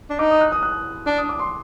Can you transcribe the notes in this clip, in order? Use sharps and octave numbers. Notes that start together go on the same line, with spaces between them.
D4
D#4 D6
D#6
F#6
D#6
F#6
D4
D#6
D6
C6